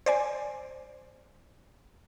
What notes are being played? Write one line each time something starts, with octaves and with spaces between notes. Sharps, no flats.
C5 D5 G#5